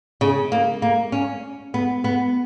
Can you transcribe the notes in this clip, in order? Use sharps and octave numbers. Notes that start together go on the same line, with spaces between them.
C#3
A#3
A#3
C#4
B3
B3